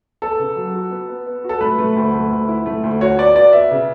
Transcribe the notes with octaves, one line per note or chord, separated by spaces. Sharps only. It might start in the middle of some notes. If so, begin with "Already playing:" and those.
B3 A4
C#3
F#3
F#4
B3
B3
B3
F#4
A4
A3 B4
A3
D2
A3
D2
E4
A3
D2
F#4 C#5
B3 D5
F#4 D5
B3 E5
C#3